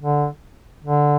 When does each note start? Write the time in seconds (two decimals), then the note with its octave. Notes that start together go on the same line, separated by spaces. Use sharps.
0.01 D3
0.84 D3